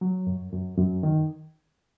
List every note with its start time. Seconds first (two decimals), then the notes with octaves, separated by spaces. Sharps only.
0.01 F#3
0.27 F#2
0.52 F#2
0.78 F#2
1.03 D#3